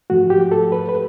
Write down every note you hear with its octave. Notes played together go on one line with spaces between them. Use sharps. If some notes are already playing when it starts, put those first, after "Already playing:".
G#2 F3 A3 F#4
G4
A4
B4
B4